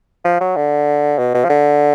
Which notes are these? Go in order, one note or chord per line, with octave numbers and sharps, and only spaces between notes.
F3
F#3
D3
B2
B2
F3
D3